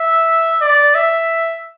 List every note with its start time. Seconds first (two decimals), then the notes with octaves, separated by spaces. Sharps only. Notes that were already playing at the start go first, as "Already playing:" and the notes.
Already playing: E5
0.62 D5
0.95 E5